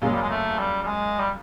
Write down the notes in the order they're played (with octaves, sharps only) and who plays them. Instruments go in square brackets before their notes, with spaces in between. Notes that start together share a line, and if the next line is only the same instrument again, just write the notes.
[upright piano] F#2 C#3 F#3 A#3 [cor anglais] G#3
[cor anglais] G3
G#3
A3
G3
G3
G#3
G3